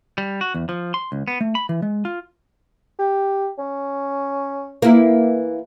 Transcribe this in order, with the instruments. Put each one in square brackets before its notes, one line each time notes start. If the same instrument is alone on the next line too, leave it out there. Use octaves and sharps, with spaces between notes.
[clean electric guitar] G3
F#4
E2
F3
C6
C#2
B3
A3
B5
E3
G#3
F4
[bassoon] G4
C#4
[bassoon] E3 [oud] A#3 E4